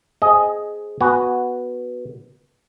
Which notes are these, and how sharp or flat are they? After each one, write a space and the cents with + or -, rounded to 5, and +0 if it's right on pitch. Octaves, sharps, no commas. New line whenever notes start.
C4 -5 G#4 +10 D#5 +0
B3 +0 F#4 +0 G#5 +0